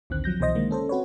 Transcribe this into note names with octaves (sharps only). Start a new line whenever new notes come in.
A#1 D#2 D3 D#3 C4 F#6
F3 F#3 G6 A#6
C2 B2 E3 C5 D#5 A#6
D3 D#3 G#3 A#3
C#4 A4 C5
C4 F#4 B4 C#5